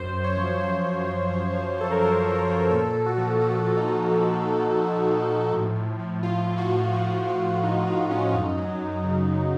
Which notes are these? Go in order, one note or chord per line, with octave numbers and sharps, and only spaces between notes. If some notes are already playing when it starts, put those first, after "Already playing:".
Already playing: F#2 C5
F#2
C#5
F3
F3 C5
F#2
F#2
F3
F3
F#2 A4
A#4
F#2 C5
F3
A#4
F3
A#2 A4
A#2
F#4
F3
F3 F#4
A#2
D#4
A#2
F3
F3
A#2
A#2
F3
F3
A2
A2
F3
F3 F4
A2
F#4
A2
F3 F#4
F3
F#4
A2
A2 D#4
F3 D#4
F3 C#4
F#2 D#4
F#3
F#2
C#3
F#2